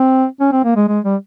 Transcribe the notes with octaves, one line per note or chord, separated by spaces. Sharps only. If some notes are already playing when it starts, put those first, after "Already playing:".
Already playing: C4
C#4
C4
A#3
G#3
G#3
G3